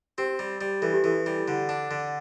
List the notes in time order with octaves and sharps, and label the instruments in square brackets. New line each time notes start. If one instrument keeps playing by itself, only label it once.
[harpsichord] C4 [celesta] G4
[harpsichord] G3
G3
[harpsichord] E3 [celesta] A4
[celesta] G4
[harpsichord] E3 [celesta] A4
[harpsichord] G3
D3
D4
D3